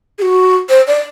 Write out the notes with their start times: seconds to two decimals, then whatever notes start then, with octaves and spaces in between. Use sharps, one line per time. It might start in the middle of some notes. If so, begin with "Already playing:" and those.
0.18 G#4
0.22 F#4
0.69 C5
0.87 D5